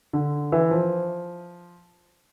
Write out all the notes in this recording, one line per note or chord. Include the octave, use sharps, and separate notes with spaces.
D3
E3
F3